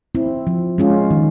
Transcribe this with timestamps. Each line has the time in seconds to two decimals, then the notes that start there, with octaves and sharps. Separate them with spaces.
0.15 C4 E4
0.47 F3
0.78 G#3 C#4 F4
1.11 D#3